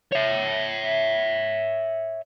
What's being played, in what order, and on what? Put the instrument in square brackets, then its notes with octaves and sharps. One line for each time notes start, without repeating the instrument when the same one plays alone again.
[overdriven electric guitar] C#5 E5